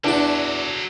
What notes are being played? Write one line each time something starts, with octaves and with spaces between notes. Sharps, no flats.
E2 F#3 D4 A4 A5